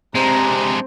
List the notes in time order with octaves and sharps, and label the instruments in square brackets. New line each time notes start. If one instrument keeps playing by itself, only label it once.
[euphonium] C3 [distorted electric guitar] G#3 D4 [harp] C4 [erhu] A#5